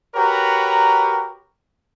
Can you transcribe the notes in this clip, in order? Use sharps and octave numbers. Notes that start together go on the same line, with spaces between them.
F#4 G4 A#4 B4 C#5 A#5